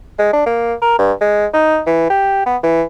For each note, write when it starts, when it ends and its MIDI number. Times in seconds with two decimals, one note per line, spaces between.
0.19 0.31 56
0.33 0.43 62
0.46 0.74 58
0.82 0.94 70
0.99 1.13 43
1.21 1.46 56
1.54 1.81 63
1.87 2.06 52
2.10 2.46 67
2.46 2.57 59
2.63 2.83 52